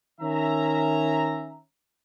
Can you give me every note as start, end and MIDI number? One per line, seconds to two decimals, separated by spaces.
0.21 1.60 51
0.21 1.60 61
0.21 1.60 76
0.21 1.60 82